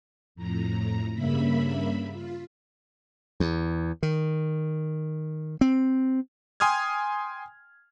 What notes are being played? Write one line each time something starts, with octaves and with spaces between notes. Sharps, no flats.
F2 A2 A#5
G2 C#3 A#3 E5 B5
F4
E2
D#3
C4
G5 G#5 C6 D#6 F6 G#6